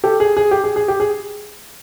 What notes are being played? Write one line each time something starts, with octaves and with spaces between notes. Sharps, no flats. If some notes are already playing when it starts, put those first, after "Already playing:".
G4 A4
G#4
G#4
G4
G#4
G#4
G4
G#4